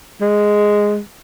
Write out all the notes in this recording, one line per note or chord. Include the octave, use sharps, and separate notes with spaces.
G#3